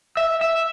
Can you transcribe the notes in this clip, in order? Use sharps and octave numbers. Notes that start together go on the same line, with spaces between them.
E5
E5